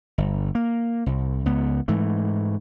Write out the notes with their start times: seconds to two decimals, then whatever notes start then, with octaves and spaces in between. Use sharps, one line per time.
0.18 G1
0.55 A#3
1.06 C2
1.46 C#2 B3
1.88 G#2 E3 A3